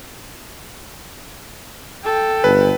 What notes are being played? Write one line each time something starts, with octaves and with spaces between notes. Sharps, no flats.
A4 G5
G1 B4